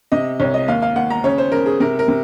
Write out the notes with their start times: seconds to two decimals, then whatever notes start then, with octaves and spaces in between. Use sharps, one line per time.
0.12 C3 D#5
0.40 C2 C#5
0.54 D#5
0.68 D#2 F5
0.82 F5
0.96 D#2 F#5
1.10 A#5
1.24 C#3 C#5
1.38 C5
1.52 C#3 A#4
1.66 G#4
1.80 C3 A#4
1.99 A#4
2.08 C3